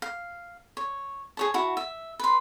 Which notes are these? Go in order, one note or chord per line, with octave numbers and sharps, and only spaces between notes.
F5
C#5
G#4 C#5 A5
E4 F#4 A5
E5
B4 C6